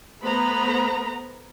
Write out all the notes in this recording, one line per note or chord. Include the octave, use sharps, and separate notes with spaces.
A3 B3 B4 C5 A#5 B5